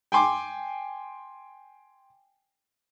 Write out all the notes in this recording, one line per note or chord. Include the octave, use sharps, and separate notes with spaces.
G5 G#5 C6 D6